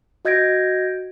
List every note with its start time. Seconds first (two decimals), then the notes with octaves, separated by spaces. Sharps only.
0.25 F#4 D#5 G6 G#6 A#6 D7